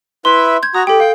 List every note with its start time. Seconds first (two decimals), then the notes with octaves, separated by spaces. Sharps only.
0.25 E4 B4 E5 C6
0.63 G6 G#6
0.74 F#4 A#5 D#6
0.87 G4 A4 G5
1.00 F5 G5